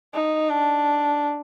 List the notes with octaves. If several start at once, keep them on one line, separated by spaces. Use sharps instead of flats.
D#4
D4